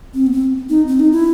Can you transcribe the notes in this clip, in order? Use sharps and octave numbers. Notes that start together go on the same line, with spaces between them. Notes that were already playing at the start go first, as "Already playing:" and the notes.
C4
B3
C4
D#4
C4
D#4
E4